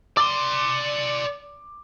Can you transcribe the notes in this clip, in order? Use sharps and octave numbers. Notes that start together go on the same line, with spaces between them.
D5 C6 D6